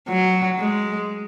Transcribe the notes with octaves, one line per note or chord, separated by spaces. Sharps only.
F#3
G#3